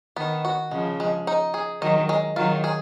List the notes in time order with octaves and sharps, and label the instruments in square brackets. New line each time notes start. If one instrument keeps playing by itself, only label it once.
[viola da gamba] D#3 [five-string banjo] B3
[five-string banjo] F#4
[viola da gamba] C#3 F3 [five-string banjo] G#3
[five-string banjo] G#3
D#4
G#4
[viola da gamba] D#3 F#3 [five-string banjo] D#5
[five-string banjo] G#3
[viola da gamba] D#3 F#3 [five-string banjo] F4
[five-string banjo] G#4